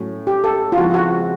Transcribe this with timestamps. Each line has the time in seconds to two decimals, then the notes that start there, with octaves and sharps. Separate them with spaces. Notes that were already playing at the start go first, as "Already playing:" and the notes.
Already playing: A2 F#3 A3 C#4 F#4
0.27 G4
0.44 A4
0.72 F4
0.78 C#3 F3 G#3 C4 E4 F#4
0.94 F#4